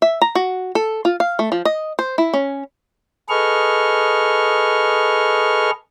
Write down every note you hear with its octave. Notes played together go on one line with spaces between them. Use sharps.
E5
A#5
F#4
A4
F4
F5
A3
F3
D#5
C5
E4
C#4
G#4 A4 B4 D#5 C#6 F6